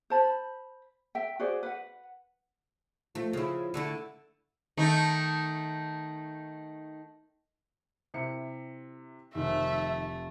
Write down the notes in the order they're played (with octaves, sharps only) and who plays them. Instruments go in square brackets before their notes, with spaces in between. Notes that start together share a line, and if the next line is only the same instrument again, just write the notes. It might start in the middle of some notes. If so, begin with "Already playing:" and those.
[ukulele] C5 A5 B5
E5 G5
F#4 G#4 C5 D5
B4 F#5
[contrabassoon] F3 [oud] A3
[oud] C#3 E4
D3 A3 E4
[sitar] D#3 A3 D#4
[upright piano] C3 E4 C#7
[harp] F1 [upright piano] D#3 [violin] A3 [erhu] E5